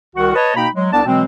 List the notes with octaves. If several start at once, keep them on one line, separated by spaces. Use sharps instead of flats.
C2 D#3 F#4 F#5
B4 C#5 D#5 A5
B2 A#3 D#4 G5 A#5 B5
F#3 G#3
C2 B3 D4 D5 A5
B2 E3 F#3 G#3 C4